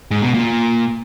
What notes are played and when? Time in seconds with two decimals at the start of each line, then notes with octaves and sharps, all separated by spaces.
0.11 G#2
0.22 B2
0.34 A#2